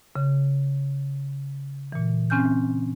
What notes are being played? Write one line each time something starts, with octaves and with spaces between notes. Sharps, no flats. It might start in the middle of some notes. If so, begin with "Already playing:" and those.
C#3
A#2 E3
C4 C#4 G#5 F6 G6